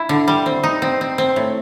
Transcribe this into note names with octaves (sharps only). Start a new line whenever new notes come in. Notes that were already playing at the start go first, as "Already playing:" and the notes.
Already playing: E4
D3
G3
C4
D#4
C4
C4
C4
A2